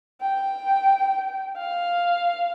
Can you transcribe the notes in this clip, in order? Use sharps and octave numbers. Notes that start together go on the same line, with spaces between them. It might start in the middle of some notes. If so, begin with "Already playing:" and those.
G5
F5